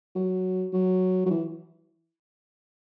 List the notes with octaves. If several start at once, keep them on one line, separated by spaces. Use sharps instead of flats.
F#3
F#3
F#3
E3